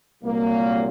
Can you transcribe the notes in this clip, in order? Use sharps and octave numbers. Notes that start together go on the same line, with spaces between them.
C2 A#2 F#3 A#3